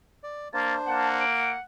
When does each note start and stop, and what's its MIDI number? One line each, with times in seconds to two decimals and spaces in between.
0.23 0.48 74
0.53 0.78 58
0.53 1.24 62
0.53 1.24 72
0.53 0.74 93
0.87 1.57 58
0.87 1.61 78
0.87 1.08 81
1.20 1.51 98